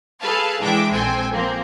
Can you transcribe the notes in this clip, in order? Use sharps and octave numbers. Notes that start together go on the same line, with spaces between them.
G#4 A4 B4 F5 A5
E3 G#3 D4 E5 G5 D6
A#1 C4 A4 G5 G#5
F3 A#3 C4